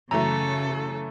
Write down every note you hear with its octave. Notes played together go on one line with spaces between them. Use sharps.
F#2 C#3 E3 A3 A4 A#5